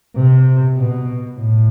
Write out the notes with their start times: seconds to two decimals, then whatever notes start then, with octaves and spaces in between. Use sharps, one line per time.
0.15 C3
0.76 B2
1.38 A2